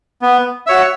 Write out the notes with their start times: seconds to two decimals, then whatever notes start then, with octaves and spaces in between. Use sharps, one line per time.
0.22 B3
0.67 F#4 C#5 E5